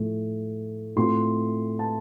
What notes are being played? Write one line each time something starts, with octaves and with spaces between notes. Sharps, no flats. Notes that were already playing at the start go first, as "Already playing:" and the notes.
Already playing: A2 F3 A3
A2 A3 C4 F4 C6
A5